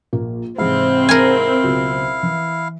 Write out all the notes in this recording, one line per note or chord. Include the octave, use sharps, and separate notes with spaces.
A#1 A#3
G#2 C3 E3 C4 E4 F5
A#4 G#5
C#2 B2 F#3
E3